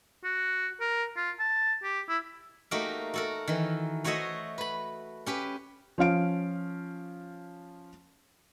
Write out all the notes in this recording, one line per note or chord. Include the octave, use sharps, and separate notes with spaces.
F#4
A#4
F4
A5
G4
E4
A3 A#3 D#4 F#4 G4 A#4
F#4 A4 A#4
D#3 E3
A3 F#4 C5 C#5 D#5 E5
B4 B5
C#4 G4 B4
F3 C#4 F5 D7